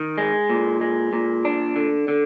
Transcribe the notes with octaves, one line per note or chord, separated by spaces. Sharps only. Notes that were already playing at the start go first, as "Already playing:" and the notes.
Already playing: D#3
G#3
A#2
G#3
A#2
D4
D3
D3